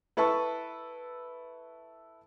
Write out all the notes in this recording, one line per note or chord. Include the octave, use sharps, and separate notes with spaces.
E4 A4 B4 A5 C#6